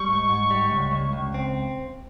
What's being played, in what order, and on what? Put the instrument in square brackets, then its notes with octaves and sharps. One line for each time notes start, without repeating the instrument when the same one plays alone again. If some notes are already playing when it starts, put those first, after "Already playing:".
Already playing: [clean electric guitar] G3 [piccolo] C#6
[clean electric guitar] G#2
G#2
G3
C#2
C#2
C#2
C4